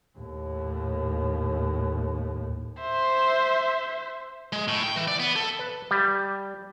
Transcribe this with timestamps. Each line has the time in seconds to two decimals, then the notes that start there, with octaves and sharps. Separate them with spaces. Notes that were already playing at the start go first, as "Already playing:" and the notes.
0.19 D#2 A2
2.81 C5 E5
4.53 G#3
4.68 A2
4.83 G5
4.96 E3
5.08 D5
5.20 B3
5.36 A4
5.59 B4
5.91 G3